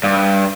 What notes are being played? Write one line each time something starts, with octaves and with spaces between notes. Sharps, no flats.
G2